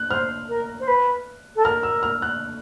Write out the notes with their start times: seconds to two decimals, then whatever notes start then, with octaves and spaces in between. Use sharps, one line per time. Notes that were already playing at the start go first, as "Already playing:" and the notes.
Already playing: F#6
0.10 C5 F6
0.49 A#4
0.80 C5
0.88 B4
1.56 A4
1.64 A#4 F6
1.83 E6
2.03 F6
2.22 F#6